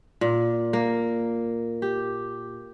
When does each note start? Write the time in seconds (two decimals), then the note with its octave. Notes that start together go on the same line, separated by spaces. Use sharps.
0.21 A#2
0.73 A#3
1.82 G4